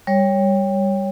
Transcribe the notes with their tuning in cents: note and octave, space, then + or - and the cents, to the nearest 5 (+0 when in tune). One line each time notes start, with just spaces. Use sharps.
G3 +15 C#5 +0